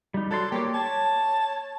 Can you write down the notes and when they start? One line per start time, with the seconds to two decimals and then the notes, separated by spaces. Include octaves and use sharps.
0.14 G3 D#4
0.31 F#3 A4 D5 C6
0.52 A#3 G4 C#5 D6
0.74 C#5 A5